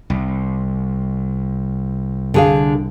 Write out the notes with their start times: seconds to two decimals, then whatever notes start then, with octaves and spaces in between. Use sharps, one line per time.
0.10 C2
2.34 D3 G#4 F5